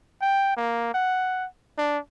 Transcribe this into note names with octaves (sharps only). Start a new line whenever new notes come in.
G5
A#3
F#5
D4